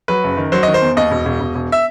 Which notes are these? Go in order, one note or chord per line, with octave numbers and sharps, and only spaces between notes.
F#3 B4
F#1
D#3
F#3 C5
D#3 D#5
C5
E2
D#2 D#5
E1
E1
E1
E1
E5